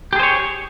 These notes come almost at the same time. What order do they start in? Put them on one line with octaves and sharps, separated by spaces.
G4 G#4 C5 C#5